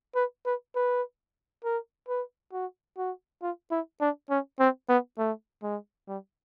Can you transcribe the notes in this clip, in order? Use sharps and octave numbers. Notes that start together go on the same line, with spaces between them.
B4
B4
B4
A#4
B4
F#4
F#4
F4
E4
D4
C#4
C4
B3
A3
G#3
G3